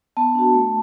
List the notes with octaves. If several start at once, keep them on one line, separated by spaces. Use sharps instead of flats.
B3 A5
D4 F#4
A3